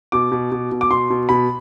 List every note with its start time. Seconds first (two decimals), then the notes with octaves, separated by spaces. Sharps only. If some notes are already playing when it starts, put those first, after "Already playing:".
0.12 B2 D6
0.31 B2
0.52 B2
0.72 B2
0.81 D6
0.90 B2 C6
1.10 B2
1.29 B2 B5